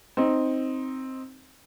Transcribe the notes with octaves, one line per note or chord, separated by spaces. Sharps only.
C4 D#4